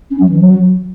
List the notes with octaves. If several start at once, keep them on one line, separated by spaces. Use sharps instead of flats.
C#4
F#3
E3
F#3